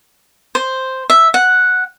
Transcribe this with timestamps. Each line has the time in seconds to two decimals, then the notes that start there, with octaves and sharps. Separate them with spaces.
0.55 C5
1.10 E5
1.34 F#5